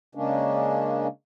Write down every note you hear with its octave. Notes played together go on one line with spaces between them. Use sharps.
C#3 G#3 A#3 C#4 D4